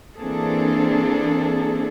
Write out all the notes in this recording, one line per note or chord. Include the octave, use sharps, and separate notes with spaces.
E3 A#3 C4 D4 G#4 A4